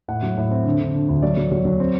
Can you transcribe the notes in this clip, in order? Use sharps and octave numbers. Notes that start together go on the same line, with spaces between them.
A2 F#5
F#3
A2
C4
D3
D3
D3
D2
F#3 D5
F#3
F#3
F#3
C4